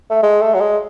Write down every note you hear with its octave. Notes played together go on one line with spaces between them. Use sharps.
A3
G#3
A3
F#3
G#3